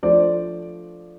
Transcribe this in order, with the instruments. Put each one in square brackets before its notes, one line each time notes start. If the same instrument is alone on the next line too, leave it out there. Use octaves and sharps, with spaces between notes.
[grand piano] F3 A3 D4 C5 D5